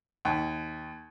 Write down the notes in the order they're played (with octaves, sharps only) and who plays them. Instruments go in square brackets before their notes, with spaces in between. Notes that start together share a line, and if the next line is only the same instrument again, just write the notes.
[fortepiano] D#2